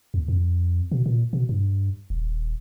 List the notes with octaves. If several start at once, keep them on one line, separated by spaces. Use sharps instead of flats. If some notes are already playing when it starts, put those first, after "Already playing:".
D#2
F2
B2
A#2
B2
G2
D#1